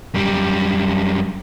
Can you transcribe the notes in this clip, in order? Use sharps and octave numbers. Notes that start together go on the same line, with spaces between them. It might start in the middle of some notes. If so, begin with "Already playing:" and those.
F#2 G3